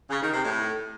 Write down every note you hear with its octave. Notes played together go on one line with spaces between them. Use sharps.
C#3
D#3
C3
A2